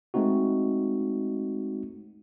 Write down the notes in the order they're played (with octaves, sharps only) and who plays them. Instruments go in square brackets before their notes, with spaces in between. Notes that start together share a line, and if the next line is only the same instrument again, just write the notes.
[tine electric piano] G#3 A3 C4 D#4 F#4